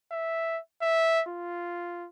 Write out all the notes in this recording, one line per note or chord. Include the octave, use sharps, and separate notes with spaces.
E5
E5
F4